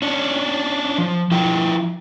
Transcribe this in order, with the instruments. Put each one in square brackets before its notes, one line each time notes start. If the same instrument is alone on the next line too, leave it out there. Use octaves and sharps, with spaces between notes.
[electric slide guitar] C#4 D4
F3
F3 E4 G5